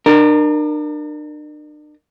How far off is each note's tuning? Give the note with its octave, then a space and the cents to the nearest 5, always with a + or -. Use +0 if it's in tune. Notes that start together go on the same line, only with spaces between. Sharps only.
D4 +40 A#4 +0